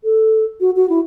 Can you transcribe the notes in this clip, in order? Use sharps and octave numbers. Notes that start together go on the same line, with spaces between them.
A4
F#4
F#4
E4